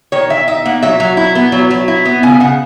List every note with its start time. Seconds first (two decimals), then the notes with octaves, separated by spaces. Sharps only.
0.12 D#3 C#5
0.30 D#3 E5
0.48 D#4 E5
0.65 A#3 F#5
0.82 F#3 E5
1.00 F#3
1.17 E4
1.35 B3
1.52 F#3
1.70 F#3
1.88 E4
2.05 B3
2.23 C#3 G#5
2.40 C#3 F#5